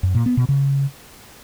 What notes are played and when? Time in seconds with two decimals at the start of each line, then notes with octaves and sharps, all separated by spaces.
0.03 F#2
0.14 A#2
0.26 B3
0.37 B2
0.49 C#3